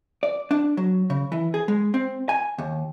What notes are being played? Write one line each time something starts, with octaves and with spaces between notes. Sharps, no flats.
D5
D4
F#3
C#3
E3
G#4
G#3
C4
G#5
D#2